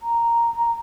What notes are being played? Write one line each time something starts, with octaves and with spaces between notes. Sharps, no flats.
A#5